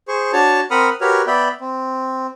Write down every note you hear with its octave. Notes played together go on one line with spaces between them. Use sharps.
G#4 C5 C#6
D4 F#4 C#5 A5
C4 A#4 F#5 B5 D#6 F6
F#4 G4 A#4 B4 C#5 F6
B3 D5 E5 G5 B5
C4